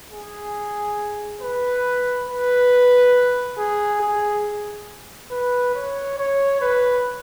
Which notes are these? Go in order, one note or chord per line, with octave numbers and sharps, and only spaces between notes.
G#4
B4
B4
G#4
G#4
B4
C#5
C#5
B4